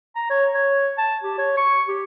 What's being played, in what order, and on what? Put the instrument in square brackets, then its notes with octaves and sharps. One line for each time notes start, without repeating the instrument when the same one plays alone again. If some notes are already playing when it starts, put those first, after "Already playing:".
[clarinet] A#5
C#5
C#5
A5
G4
C#5
C#6
G4